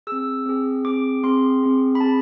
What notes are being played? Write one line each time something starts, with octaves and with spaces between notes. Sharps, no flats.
C4 G#4 E6
C4 G#4
C4 G#4 D6
C4 G#4 C6
C4 G#4
B5
C4 G#4 A5